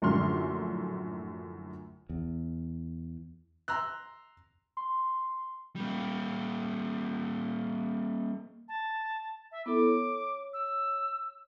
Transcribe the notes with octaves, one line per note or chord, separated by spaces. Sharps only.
A#1 F#2 A2 D3 C6 F6
E2
A#5 C6 E6 F#6
C6
G3 A#3
A5
E5
B3 E4 A4 D6
C#5
E6